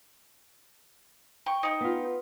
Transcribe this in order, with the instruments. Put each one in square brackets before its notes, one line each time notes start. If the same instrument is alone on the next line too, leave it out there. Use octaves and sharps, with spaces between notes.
[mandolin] G5 C#6
D#4 G5
[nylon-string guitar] B3 F4